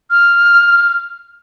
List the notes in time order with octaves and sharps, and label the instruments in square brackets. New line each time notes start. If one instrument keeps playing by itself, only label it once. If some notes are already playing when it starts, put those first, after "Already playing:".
[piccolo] F6